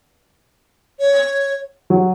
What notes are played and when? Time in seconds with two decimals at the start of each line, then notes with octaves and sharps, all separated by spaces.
1.00 C#5
1.90 F#3